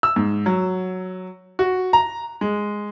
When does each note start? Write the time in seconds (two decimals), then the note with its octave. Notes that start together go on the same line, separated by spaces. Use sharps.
0.03 E6
0.16 G#2
0.46 F#3
1.59 F#4
1.93 A#5
2.41 G#3